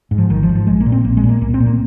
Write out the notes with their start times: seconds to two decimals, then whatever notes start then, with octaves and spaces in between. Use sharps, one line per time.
0.11 G#2
0.18 F3
0.30 G#1 D#3
0.43 F3
0.49 G#2
0.55 F3
0.67 A#1 G#3
0.80 A#3
0.86 A#2
0.92 C4
1.05 A#1 A#3
1.17 G#3
1.24 A#2
1.29 A#3
1.41 C2 A#3
1.54 C4
1.60 A#2
1.66 A#3